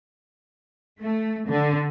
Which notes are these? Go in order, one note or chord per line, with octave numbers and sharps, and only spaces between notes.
A3
D3